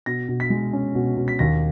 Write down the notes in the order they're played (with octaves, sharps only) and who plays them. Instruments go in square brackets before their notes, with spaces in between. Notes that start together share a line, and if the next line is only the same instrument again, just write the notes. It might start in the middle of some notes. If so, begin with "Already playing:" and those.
[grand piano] B2 A#6
B2
B6
G#3
C#4
B2
B2
B6
D#2 A#6